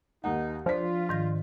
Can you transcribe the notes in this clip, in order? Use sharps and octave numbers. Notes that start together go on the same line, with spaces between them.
D#2 D#4 F#5
F3 D4 F4 D5 B6
G#2 D#3 A#6